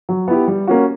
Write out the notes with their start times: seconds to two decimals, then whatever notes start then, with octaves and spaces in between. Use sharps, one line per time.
0.09 F#3
0.28 B3 E4 G4
0.48 G3
0.67 A#3 C#4 F#4